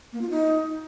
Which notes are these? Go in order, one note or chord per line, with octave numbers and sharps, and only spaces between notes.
A#3
F4
D#4